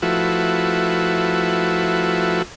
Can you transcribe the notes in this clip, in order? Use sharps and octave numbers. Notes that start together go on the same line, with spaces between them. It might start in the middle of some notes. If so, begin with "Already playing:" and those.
F3 A3 E4 F#4 B4